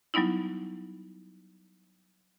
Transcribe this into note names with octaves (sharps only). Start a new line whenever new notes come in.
F#3 G3 B3 D#4 E4